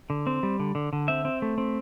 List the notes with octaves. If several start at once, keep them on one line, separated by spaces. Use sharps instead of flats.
D3
C4
G3
D3
D3
D3
C4 E5
C4
A3
C4